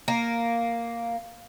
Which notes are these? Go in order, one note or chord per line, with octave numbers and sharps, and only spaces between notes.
A#3